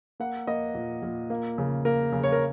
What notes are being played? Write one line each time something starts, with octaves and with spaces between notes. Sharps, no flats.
A#3 F#5
A#3 D#5
A#2
A#2
A#3
C#3
A#3 A#4
C#3
C#5
A#4